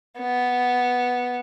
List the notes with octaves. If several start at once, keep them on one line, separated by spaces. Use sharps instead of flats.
B3